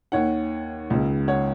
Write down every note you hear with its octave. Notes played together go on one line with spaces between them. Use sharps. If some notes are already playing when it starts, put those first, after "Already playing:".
D#2 D#3 C#5 F#5
C#2 C#3
C#5 F#5